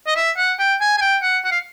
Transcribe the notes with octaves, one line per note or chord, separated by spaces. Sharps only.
D#5
E5
F#5
G5
G#5
G#5
G5
F#5
F#5
F5